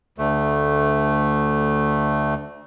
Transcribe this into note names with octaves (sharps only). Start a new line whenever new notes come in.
D2 A3